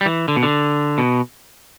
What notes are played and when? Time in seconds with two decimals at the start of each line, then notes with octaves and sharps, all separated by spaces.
0.01 G3
0.06 E3
0.28 D3
0.36 B2
0.43 D3
0.98 B2